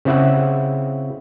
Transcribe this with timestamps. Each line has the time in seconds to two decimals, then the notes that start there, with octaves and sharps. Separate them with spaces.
0.05 C#3 C4 E4 E5 F#5